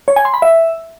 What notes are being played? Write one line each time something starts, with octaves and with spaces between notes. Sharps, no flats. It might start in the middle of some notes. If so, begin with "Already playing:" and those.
C#5
G#5
C6
B5
E5